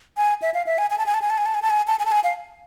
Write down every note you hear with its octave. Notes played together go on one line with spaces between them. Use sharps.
G#5
E5
F5
E5
G#5
G#5
A5
G#5
A5
G#5
A5
G#5
A5
G#5
A5
G#5
A5
G#5
A5
G#5
F5